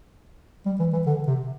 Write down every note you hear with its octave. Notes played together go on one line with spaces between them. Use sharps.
G3
E3
E3
D3
C3